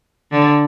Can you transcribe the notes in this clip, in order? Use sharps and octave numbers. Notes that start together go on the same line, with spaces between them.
D3